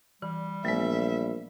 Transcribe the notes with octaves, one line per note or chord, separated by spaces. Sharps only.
E3 G3
A#1 A3 B3 E5